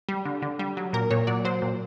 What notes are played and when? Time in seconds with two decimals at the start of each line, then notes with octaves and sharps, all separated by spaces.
0.09 G3
0.25 D3
0.42 D3
0.59 G3
0.77 F#3
0.93 A#2 A#4
1.11 A#2 C#5
1.27 F#3 D5
1.45 F#3 C5
1.62 A#2